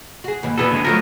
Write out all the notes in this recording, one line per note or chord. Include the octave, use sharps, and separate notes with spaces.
F#4 G#4
D#2 G#2 E3
A#2 B3 F#4 G#4 A4 B4
D3 G#3 B3
F3 F#3 A3 B3 A#4